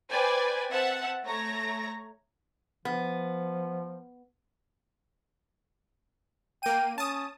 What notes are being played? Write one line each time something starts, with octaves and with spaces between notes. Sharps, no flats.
B4 C5 D5 G5 G#5
C4 E5 F#5 A5
A3 C#5 A#5 A#6
F3 B3
A#3 G5 D#7
C#4 A5 D#6